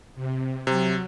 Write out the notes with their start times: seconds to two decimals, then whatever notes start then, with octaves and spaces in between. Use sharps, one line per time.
0.15 C3
0.67 C3 F#3